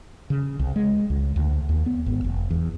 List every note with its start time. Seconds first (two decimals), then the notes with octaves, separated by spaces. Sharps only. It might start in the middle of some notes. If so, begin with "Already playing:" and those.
0.30 C#3
0.59 C2
0.76 G#3
1.10 C#2
1.36 D2
1.69 D#2
1.86 B3
2.06 G#1
2.24 F1
2.51 E2